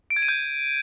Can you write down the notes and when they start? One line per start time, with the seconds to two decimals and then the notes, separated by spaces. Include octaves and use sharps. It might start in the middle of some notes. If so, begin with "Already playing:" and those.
0.10 D7
0.16 G#6
0.22 D#7
0.28 G6